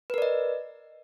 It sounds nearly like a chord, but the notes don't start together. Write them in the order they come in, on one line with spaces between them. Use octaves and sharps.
B4 A#4 D5 D#5